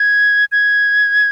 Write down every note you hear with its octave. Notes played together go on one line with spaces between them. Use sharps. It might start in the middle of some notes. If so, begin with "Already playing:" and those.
Already playing: G#6
G#6